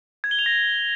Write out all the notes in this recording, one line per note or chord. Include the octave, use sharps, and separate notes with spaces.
G#6
G7
F7
A#6